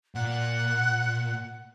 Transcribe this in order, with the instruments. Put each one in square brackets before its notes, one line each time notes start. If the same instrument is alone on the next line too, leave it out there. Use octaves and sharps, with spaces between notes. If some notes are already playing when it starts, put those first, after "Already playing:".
[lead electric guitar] A#2 [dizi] F#5